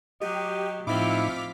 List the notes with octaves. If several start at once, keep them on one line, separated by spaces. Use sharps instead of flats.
F#3 G4 D#5
A2 F3 C4 D#4 E4 D6 F6 B6